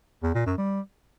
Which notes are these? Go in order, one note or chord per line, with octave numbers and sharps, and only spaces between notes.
E2
A#2
F#2
G3